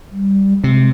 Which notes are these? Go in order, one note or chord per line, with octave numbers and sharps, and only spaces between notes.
G3
C3 G#3